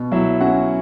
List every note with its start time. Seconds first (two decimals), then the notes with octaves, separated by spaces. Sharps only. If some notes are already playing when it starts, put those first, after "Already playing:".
Already playing: B2
0.12 F#3 E4 E5
0.41 C#4 F#4 F#5